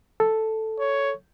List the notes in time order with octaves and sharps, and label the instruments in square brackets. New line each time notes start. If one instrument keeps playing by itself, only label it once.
[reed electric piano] A4
[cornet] C#5